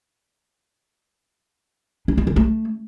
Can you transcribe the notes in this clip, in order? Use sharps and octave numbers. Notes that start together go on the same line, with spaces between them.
D4
B3
D3
A3